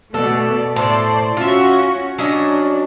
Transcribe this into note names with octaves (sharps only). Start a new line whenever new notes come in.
B2 A3 A4 D5
A2 A4 C5 D5
C#4 F4 F#4 E5
F#3 C#4 D4 D#5